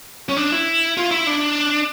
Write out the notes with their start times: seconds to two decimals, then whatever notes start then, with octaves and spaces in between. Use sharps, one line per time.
0.29 C#4
0.37 D4
0.52 E4
0.97 F4
1.11 E4
1.27 D4